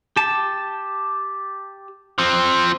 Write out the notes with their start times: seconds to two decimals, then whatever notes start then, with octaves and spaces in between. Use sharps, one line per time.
0.16 G4 A5
2.18 F3 C4